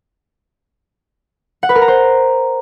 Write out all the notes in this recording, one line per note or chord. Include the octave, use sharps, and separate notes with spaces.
F#5
B4
A#4
A#5
C5